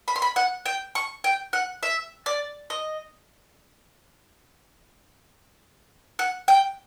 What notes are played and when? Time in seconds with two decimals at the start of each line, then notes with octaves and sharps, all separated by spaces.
0.08 B5
0.16 C6
0.22 B5
0.36 F#5
0.66 G5
0.95 C#6
1.24 G5
1.53 F#5
1.83 E5
2.26 D5
2.70 D#5
6.19 F#5
6.48 G5